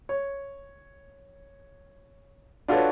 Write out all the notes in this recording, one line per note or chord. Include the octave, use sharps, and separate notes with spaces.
C#5
D4 F4 F#4 A4 B4 C#5